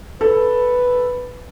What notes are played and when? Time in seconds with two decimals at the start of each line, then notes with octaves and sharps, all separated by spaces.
0.21 A4 B4